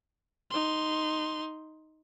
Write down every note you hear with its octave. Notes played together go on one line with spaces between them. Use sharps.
D#4 C6